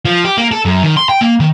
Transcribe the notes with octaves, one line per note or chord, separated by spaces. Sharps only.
F3
G4
A#3
A4
F#2
D#3
C6
G5
A#3
D#3